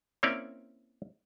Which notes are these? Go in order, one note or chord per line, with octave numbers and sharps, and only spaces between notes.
A#3 C4 C#4 E4 C#5 D5